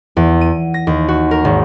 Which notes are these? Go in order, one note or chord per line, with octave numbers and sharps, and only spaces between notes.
E2
D#7
A#6
D#2
F#4
A#4
G#1